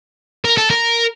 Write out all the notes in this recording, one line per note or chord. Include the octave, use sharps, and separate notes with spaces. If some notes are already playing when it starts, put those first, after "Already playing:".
A#4
A4
A#4